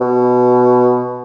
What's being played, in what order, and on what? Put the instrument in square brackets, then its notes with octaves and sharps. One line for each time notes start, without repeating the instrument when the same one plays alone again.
[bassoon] B2